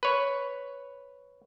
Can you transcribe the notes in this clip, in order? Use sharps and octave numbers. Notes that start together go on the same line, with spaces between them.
B4 C#5